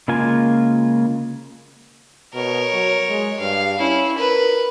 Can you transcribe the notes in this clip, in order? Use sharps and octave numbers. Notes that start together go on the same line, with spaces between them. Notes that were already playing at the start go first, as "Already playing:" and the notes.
C#3 G#3 A#3 F4 G#5
B2 A#4 C#5
F#3
G#3
G2 F5
C#4 E4
A#4 B4